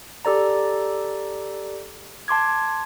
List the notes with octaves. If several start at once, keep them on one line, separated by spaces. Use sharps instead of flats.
G4 A4 D5 A#5
A5 C6 D6 G#6